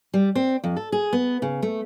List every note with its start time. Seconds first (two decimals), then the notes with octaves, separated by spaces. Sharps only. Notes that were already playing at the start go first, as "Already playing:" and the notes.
0.14 G3
0.35 C4
0.64 F2
0.77 A4
0.92 G#4
1.13 B3
1.42 C#3
1.62 A3